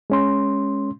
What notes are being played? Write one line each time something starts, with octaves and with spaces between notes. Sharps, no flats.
G#3 C#4 C6